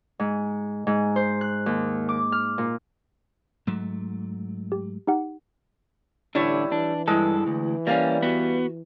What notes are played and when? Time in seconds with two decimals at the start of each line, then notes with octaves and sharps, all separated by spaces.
0.19 G#2
0.87 G#2
1.16 C5
1.41 F#6
1.66 D#2
2.09 D6
2.32 F6
2.58 A#2
3.67 G#2 F#3 A3
4.72 G4
5.07 D#4 G4 F#5
6.35 A1 D3 G3 D4 E4 C#5
6.72 E3 D4
7.08 G2 G#3 E4 A4
7.47 D2 E3
7.87 G3 A#3 C#4 D5 F5
8.22 B3 F#4